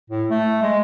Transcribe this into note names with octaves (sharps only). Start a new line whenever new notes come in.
A2
A3
G#3